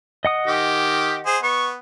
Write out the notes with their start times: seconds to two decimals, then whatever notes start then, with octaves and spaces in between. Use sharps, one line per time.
0.25 D#5 F#5 D#6
0.47 D#3 G4
1.26 G#4 C5
1.43 B3 C#6